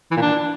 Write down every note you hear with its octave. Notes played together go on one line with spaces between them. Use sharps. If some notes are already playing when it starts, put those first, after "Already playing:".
E3
A#2
D4